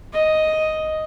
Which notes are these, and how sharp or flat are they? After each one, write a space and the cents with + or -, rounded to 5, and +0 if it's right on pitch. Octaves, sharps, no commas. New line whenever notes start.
D#5 +5